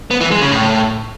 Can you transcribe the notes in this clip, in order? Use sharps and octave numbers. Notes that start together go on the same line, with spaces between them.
B3
E3
G#3
C#3
A2